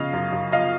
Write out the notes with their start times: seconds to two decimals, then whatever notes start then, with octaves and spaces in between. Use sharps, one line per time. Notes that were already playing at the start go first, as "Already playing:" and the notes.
Already playing: C#3 F3 D#5 F5
0.13 F#2
0.32 F#2
0.52 F3 D#5 F5